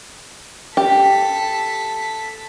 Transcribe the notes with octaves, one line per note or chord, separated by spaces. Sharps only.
G4 A4 B6